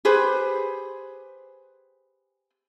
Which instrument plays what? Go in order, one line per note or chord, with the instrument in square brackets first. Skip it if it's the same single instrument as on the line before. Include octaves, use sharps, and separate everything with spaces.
[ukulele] G4 G#4 B4 C5